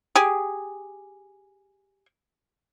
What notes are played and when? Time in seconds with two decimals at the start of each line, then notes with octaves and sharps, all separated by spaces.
0.16 G4 G#4